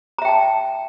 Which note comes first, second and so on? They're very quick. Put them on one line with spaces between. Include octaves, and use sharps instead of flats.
A#5 E5 G5 A5